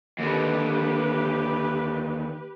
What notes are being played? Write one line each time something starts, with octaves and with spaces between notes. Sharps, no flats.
D#2 D3 G4 B4